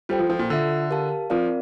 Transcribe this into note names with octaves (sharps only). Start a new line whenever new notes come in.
G3 F4 A4 C5 G5
F3
F3
A#2
D3 F4 A4 E5
G4 A#4 F5 A5
F3 C4 F4 A#4 D5 F5